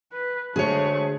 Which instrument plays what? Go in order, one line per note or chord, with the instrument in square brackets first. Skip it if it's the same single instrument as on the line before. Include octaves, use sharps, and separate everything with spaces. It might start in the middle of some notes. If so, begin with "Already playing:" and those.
[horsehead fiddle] B4
[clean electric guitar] D3 F#4 C5 [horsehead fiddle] G#3 A3 [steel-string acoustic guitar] G#4 C#5